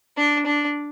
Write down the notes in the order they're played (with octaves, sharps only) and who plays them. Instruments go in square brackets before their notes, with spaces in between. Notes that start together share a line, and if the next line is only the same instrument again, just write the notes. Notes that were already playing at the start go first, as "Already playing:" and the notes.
[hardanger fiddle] D4
D4